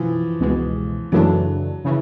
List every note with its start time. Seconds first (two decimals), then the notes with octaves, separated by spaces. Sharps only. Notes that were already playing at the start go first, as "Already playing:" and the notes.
Already playing: B2 E3 F3
0.40 C#2 B2 G#3
1.12 F#2 C#3 E3 F#3 A3 D4
1.85 C#3 E3